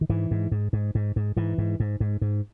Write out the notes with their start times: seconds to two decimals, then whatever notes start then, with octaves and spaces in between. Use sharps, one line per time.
0.01 D#3
0.09 G#2 E3
0.31 G#2
0.51 G#2
0.73 G#2
0.95 G#2
1.16 G#2
1.37 G#2 E3
1.58 G#2
1.80 G#2
2.00 G#2
2.21 G#2